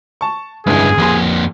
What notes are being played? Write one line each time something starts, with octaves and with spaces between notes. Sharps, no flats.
A5 C#6
F1 C#2 G2 D3 E4 G#4
A1 F2 A#3 G#5 C6